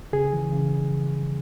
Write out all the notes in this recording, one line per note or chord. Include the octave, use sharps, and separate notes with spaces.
C#3 G#4
E3
C#3